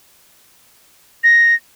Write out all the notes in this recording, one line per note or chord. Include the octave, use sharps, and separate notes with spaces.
A#6